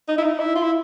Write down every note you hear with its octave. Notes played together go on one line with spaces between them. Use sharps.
D#4
E4
D#4
E4
F4
E4